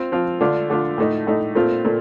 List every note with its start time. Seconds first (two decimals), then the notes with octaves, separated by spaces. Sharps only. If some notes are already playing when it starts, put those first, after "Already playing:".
Already playing: C4 F4
0.12 F3 C4 F4
0.41 D3 A3 D4 F4
0.70 D3 A3 D4 F4
0.98 A2 A3 D#4
1.27 A2 A3 D#4
1.55 A#2 A3 C4 F4
1.85 A#2 A3